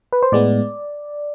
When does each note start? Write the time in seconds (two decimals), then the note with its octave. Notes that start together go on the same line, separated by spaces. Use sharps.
0.13 B4
0.23 C5
0.32 A2 G#3 B3 D5